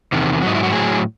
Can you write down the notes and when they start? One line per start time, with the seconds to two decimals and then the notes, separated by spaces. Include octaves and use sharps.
0.12 E2 C3 D#3
0.42 G#2 F#3 D#4
0.55 E4
0.63 F#4
0.72 A2 F#3 G#4